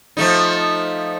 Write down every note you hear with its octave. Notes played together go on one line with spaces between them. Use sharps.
F3 A3 D#4